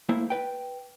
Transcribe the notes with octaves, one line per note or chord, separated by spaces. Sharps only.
A3 A#3 E4 C5 E5
B4 G5